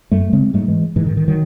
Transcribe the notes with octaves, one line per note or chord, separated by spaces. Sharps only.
F#2 F#3 A3
C#3 G#3 C4
G#2 F#3 A3
E3 G#3
G#2 E3
D#3
D#3
D#3 F#3